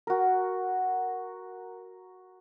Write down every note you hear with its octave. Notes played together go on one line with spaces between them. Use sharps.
F#4 A#4